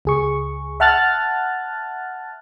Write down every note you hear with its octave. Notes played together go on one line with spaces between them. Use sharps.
C#2 G#4 C#6
E5 F#5 A5 F6 F#6 A6